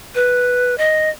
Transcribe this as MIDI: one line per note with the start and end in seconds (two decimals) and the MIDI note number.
0.15 0.77 71
0.78 1.10 75